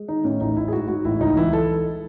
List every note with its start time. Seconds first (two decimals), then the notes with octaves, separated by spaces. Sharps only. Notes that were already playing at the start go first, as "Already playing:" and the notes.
Already playing: G#3
0.08 D#3 D#4
0.24 A2 C#4
0.41 A1 D#4
0.57 A1 E4
0.68 G#4
0.73 G#2 F#4
0.88 G#2 F#4
1.05 A1 E4
1.20 C#2 D#4
1.36 E3 E4
1.52 E3 A4